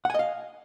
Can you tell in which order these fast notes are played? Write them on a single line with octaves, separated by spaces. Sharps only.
F#5 G#5 D#5 F5